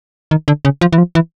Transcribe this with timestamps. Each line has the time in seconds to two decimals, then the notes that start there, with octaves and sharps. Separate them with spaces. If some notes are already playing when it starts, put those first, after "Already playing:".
0.31 D#3
0.48 D3
0.65 C#3
0.81 F3
0.93 E3
0.98 F3
1.15 E3